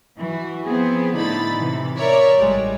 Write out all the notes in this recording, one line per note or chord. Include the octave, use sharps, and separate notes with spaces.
E3 F#4
F3 B3 C4 G#4
A2 D3 D#4 E4 B5 A6
C3 E3
A#4 C#5 D5 E5
A1 G3 G#3